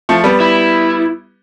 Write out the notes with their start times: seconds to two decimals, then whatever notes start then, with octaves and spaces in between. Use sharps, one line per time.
0.09 F3 A3
0.24 G3 B3
0.40 E4